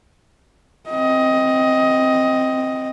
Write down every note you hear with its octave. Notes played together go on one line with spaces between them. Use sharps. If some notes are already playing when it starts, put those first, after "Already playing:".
C4 D#5